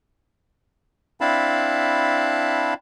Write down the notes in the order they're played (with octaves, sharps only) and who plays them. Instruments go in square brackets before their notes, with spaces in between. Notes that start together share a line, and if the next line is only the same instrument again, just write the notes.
[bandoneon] C4 D4 E4 F5 A5 B5